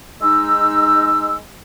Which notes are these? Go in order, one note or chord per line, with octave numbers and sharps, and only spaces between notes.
G#3 D#4 E6